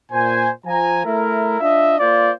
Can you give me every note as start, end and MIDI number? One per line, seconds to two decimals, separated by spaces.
0.12 0.50 46
0.12 0.50 72
0.12 0.50 80
0.66 1.05 53
0.66 1.05 80
0.66 1.05 82
1.05 1.60 57
1.05 1.60 64
1.05 1.60 70
1.60 1.98 62
1.60 1.98 65
1.60 1.98 75
1.60 1.98 76
1.99 2.32 58
1.99 2.32 65
1.99 2.32 72
1.99 2.32 74